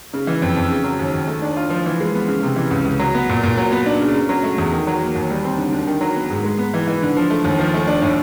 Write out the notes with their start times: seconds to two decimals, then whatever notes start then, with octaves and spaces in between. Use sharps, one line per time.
0.13 C#3
0.27 E3
0.42 F2
0.56 F2
0.70 C#3
0.84 F#3
0.99 D#2
1.14 D#2
1.27 A3
1.42 D4
1.57 F4
1.70 F3
1.86 E3
2.00 G#3
2.14 B3
2.28 C#3
2.43 C3
2.56 E3
2.71 C#2
2.85 C#2
2.99 F#3
3.14 B3
3.29 A#2
3.43 A#2
3.57 F#3
3.72 B3
3.86 D4
4.00 C#3
4.14 C#3
4.29 F#3
4.43 A3
4.58 E2
4.72 D#3
4.87 F#3
5.01 A#3
5.15 D#2
5.30 G3
5.45 C4
5.58 D3
5.72 D3
5.87 D#3
6.01 F#3
6.16 B3
6.30 G#2
6.44 G#3
6.58 B3
6.74 E3
6.88 E3
7.03 D3
7.17 F3
7.30 A3
7.44 D#2
7.59 F3
7.74 A3
7.87 D4
8.02 A2